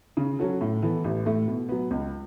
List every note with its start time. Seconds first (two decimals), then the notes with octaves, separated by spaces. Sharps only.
0.17 C#3
0.39 F#3 C#4 F#4 A4
0.61 A2
0.82 E3 B3 A4
1.04 A1
1.26 A2 A3
1.48 B2
1.69 F#3 B3
1.91 C#2